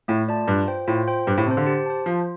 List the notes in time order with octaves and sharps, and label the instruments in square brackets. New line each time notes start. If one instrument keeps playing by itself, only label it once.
[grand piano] A2 [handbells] A3
[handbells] F4 D5 A5
[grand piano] G2 [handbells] F4
[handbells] C5 G5
[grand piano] A2 [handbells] F4
[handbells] C5 G5
[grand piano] G2 [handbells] G4
[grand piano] A2
[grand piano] C3 [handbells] C5 A5
[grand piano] D3
[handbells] G4
C5 A5
[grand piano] F3 [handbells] F4